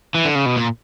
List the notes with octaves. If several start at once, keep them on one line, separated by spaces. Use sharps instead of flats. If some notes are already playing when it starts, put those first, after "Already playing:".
E3
D3
C#3
B2
A#2